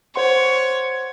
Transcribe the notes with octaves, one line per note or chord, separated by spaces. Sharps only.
C5 C#5 F#5 C6